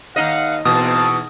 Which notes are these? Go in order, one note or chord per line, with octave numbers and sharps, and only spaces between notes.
D#2 D#4 D#5 F5 F#5
E2 B2 A#3 C4 A5 D#6